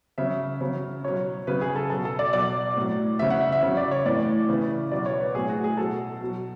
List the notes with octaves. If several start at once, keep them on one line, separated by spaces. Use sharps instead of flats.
C#3 F#3 E5
C#3 F#3
B2 F#3 C#5
C#3 F#3 B4
G#4
A4
B2 F#3 A4
A4
D5
B2 F#3 D5
A2 F#3
C#3 F#3 E5
F#5
E5
E5
C#3 F#3
D5
C#5
A2 E3 D5
C#3 E3
B2 F#3 D5
C#5
B4
A2 F#3 G#4
F#4
G#4
B2 F#3 A4
B2 F#3